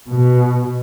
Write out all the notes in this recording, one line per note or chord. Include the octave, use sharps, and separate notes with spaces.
B2